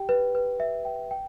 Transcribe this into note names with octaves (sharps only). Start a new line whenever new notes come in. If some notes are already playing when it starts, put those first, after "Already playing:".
Already playing: G4 G5
B4
B4
E5
G5
G5